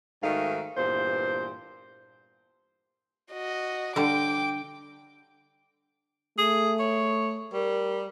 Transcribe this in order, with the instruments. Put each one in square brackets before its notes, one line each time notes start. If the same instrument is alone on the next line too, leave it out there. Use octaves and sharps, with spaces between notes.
[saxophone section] G#2 D#3 A3 D#4 F#4 F5
E2 G2 A#2 C5
[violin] F#4 D#5
[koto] D3 G3 [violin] G5 D6
[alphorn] A3 [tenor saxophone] G#4
[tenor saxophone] C#5
[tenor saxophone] G3 [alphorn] A#4